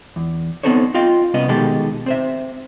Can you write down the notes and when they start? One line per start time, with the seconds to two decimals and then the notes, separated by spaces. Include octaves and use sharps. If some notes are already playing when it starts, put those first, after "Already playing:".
0.16 E2
0.64 B3 C4 D#4 A4 C5 C#5
0.94 F4 D#5 F5 G5
1.34 C2 B3 C#4 D#5
1.48 B2 D#3 G#3 G4 A4
2.06 C4 C5 E5